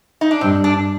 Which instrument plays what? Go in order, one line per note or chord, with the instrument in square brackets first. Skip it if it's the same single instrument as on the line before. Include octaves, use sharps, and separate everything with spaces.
[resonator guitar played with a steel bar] D#4
D4
[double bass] G2 [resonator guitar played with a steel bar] C4
[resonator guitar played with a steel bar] D4